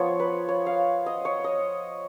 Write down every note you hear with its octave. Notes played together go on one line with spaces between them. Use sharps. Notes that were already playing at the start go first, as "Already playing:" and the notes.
Already playing: F3 B3 F4 C#5
B4
C#5
F5
D#5
C#5
D#5